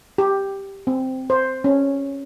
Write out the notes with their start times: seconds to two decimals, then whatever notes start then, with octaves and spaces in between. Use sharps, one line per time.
0.18 G4
0.87 C4
1.30 C5
1.64 C#4